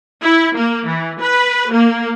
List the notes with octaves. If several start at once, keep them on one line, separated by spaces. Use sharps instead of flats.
E4
A#3
E3
B4
A#3